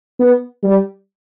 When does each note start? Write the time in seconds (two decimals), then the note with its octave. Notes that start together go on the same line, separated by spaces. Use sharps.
0.19 B3
0.63 G3